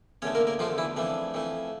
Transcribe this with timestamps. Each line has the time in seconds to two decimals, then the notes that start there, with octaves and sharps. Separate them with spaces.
0.22 E2 D3 A3 C#4 C#5
0.35 A#3 A#4
0.47 A#3 A#4
0.59 E2 D3 F3 A3 F4
0.78 E3 E4
0.96 F2 E3 A3 D4
1.34 F2 E3 A3